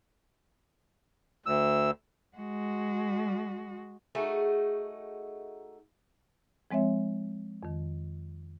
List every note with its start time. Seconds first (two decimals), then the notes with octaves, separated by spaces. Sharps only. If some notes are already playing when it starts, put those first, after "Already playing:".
1.46 D2 E6
2.37 G#3 F#4
4.15 A3 D#4 F#4 G#4
6.71 F3 G#3 C4 C#5 E5
7.63 F2 D#3